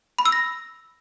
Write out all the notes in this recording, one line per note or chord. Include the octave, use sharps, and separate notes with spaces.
B5
E6
A#6